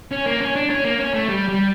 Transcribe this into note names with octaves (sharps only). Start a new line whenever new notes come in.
C#4
A#3
C#4
D4
C#4
A#3
C#4
A3
G3
G3